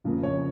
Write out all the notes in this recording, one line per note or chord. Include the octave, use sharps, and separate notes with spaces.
F2 C#3 F3 A#3
C#5